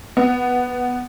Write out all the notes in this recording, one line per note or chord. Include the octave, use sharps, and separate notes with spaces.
B3